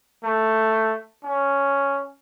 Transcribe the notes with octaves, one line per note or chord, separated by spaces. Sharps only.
A3
C#4